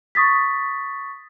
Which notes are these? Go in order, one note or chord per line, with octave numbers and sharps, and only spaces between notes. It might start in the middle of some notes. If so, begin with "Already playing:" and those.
C#6 D#6 A6 B6